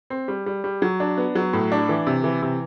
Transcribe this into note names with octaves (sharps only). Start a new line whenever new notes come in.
C4
G3
G3
G3
F#3
D4
B3
F#3
A2
D4
E3
C3
E3
C3